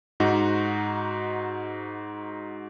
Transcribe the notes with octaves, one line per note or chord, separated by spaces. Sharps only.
G#2 D#4 F#4